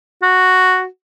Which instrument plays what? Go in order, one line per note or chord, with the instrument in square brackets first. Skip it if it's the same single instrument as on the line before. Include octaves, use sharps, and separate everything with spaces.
[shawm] F#4